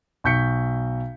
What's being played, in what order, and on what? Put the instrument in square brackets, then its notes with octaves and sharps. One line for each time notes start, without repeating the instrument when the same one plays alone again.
[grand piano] B1 C#6 G6 B6 C#7